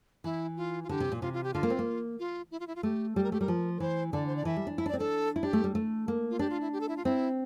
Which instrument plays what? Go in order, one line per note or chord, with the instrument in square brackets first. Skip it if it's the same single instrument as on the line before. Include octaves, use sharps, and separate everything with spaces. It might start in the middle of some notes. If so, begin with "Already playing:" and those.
[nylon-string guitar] E3 [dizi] E4
[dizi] F4
F4
[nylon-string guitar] D3 [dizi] G4
[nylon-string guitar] C3
A#2
[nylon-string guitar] C3 [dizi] F4
[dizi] F4
G4
[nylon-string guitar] D3 [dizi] F4
[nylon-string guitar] A#3
C4
A#3
[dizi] F4
E4
F4
E4
F4
[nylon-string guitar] A3 [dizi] G4
[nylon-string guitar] G3 [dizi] G4
[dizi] A#4
[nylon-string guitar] A3 [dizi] G4
[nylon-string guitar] G3 [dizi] A#4
[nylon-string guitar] F3
[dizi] A#4
[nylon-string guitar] E3 [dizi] C5
[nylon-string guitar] D3 [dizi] D5
[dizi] C5
D5
[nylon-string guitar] E3 [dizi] E5
[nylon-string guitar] G3
D4
[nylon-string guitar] E4 [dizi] E5
[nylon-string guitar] D4
[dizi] D5
[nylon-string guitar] C4
[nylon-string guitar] D4 [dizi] A4
[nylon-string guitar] E4
[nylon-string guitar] D4 [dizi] G4
[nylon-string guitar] A3
G3
A3
A#3
[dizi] F4
[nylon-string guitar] D4 [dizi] G4
[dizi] F4
E4
G4
A4
E4
F4
[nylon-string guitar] C4 [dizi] E4